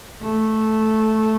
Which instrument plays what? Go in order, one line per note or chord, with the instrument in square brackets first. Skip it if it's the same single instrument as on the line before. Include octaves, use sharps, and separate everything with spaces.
[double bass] A3